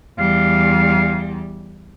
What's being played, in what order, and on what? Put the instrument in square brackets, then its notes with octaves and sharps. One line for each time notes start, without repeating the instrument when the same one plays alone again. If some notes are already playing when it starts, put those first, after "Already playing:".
[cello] E2 G3 [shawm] F5